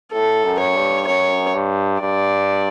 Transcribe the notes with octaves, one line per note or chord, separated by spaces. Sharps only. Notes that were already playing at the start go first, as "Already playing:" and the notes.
A2 A4
F#2
C#5
G2
F#2 C#5
G2
G2 D5